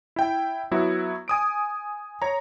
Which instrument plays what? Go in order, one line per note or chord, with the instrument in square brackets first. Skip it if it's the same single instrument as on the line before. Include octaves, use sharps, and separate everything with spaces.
[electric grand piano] E4 G5
F#3 B3 E4 F#4
G#5 D#6 D7
C#5 A#5